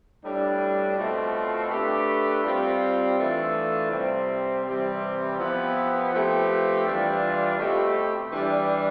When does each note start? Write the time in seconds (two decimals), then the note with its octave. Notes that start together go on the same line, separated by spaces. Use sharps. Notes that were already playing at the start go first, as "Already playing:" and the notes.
0.23 A2 G3 D4
0.97 B2 A3 C4 F4
1.70 A3 D4 G4 B4
2.43 G3 C4 F4
3.17 E3 A3 D4 F4 A4
3.90 C3 G3 C4
4.64 C3 E3 G3 C4
5.37 F3 B3 E4 G4 B4
6.11 F3 A3 C4 G4 B4
6.85 E3 G3 D4 F4
7.57 B2 A3 C4 G4
8.31 E3 G3 D4